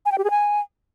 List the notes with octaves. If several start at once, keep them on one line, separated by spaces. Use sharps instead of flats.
G#5
G5
G4
G#4
G#5